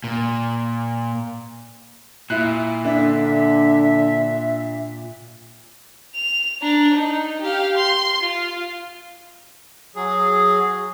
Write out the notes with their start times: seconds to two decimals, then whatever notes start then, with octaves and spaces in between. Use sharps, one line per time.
0.04 A#2
2.30 A#2 E4 F#6
2.85 D3 D4 E5
6.15 F7
6.62 D4 A#5
6.94 D#4
7.42 G4 F5
7.77 C6
8.21 F4
9.96 F#3 G#4